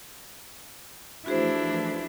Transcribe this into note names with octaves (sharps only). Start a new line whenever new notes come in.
E3 F3 A3 D4 E4 F#4 G#4 C5